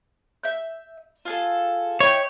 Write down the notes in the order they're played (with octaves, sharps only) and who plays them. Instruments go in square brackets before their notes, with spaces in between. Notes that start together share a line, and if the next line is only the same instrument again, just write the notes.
[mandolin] E5 G6
F4 G#4 A4
[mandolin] E4 D#5 G5 [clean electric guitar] C#5